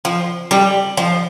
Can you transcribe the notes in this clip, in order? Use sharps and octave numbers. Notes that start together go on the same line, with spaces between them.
F3
G3
F3